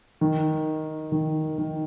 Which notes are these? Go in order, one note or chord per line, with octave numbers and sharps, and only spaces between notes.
D#3
D#3
D#3